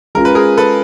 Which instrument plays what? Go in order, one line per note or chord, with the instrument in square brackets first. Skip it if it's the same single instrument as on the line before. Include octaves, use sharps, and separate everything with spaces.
[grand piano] G#3 C#4 F4 [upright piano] A#4
[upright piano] B4
G#4 A#4
A4 B4